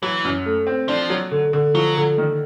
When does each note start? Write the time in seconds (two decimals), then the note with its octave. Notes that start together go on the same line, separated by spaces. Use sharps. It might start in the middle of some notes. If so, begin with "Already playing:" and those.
0.02 E3 F#3
0.24 F#2
0.46 A3
0.67 C4
0.88 F3 D4
1.10 F#3
1.31 D3
1.53 D3
1.74 F3 F#3
1.97 D3
2.18 D#3